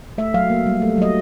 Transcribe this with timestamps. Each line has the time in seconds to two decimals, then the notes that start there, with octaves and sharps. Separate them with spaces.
0.18 A3 E5
0.34 F#3 F5
0.50 A#3
0.66 G3
0.82 A3
0.98 F#3 D#5